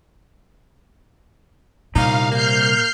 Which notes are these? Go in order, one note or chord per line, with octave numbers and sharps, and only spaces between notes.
C2 A#2 D#4 F5
A#3 F6 G6 C7